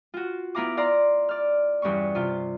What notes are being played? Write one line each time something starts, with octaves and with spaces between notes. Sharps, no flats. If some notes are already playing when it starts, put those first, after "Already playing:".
F4 F#4
B3 E4 F5 A#5 D6
D5 F5 A#5 C6
D5 F6
E2 G2 C#4 C#6
C3 F4